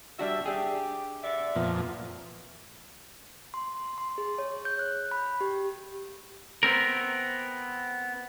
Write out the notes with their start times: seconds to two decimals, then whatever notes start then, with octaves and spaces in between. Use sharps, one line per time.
0.19 G3 D4 F#4 E5
0.46 D4 G4 G#4
1.23 D3 D5 E5
1.56 F2 A#2 F3 B3
3.54 C6
3.98 C6
4.18 G#4
4.38 C#5
4.65 G6
4.79 F#6
5.11 B5
5.41 G4
6.63 B3 C4 A#4